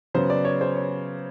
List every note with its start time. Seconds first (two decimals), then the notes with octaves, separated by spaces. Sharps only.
0.14 C#3 F#3 B3 C5
0.30 D5
0.45 C#5
0.61 C5
0.76 C#5